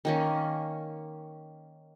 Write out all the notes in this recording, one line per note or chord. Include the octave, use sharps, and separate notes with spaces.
D#3 A#3 C#4